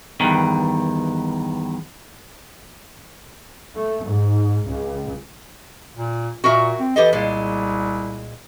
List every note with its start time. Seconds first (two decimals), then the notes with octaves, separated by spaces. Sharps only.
0.20 E2 G2 D#3
3.75 A3
4.04 G#2
4.67 C#2
5.97 A#2
6.44 A#2 F#4 A#4 E5
6.79 C4
6.96 E3 G4 A4 D#5
7.13 C2 A#2 G#3